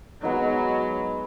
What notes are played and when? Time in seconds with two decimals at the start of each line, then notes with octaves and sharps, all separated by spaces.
0.23 F#3 G#3 B3 D#4